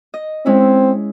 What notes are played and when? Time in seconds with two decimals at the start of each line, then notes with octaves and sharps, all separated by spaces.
0.14 D#5
0.46 G#3 C4 C#4 E4